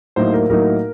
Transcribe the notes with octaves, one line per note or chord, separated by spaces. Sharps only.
A2 F#3 A#3 D#4 C5
A#4
A2 F#3 A#3 D#4 A#4